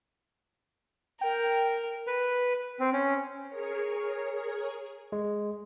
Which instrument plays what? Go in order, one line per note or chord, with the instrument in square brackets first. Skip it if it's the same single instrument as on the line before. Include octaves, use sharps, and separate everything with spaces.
[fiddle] A#4 [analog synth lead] G5
[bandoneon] B4
C4
C#4
[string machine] G#4 A#4 C#5
[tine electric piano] G#3